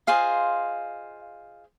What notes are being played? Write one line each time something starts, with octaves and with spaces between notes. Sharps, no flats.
F4 G#4 C5 D#5 F5